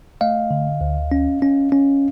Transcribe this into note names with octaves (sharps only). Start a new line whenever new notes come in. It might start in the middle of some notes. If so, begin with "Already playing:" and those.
A3 D#5 F5
D3
D2
C#4
C#4
C#4